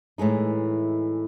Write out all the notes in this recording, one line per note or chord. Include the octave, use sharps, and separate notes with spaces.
A2 E3 G#3 D#4